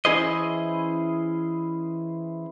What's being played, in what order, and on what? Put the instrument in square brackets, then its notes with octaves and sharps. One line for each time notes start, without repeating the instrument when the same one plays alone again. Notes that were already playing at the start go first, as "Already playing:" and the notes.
[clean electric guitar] E3 C#4 E4 G#4 C5 D#5